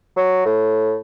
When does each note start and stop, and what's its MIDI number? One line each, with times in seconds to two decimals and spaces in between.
0.17 0.44 54
0.46 0.97 45